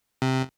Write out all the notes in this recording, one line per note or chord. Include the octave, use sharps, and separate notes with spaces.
C3